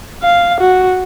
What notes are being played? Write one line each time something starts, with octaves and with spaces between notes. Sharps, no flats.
F5
F#4